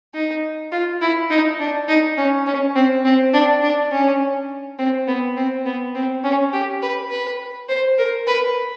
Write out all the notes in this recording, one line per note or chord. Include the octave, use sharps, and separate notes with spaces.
D#4
F4
E4
D#4
D4
D#4
C#4
C#4
C4
C4
D4
D4
C#4
C4
B3
C4
B3
C4
C#4
G4
B4
B4
C5
A#4
B4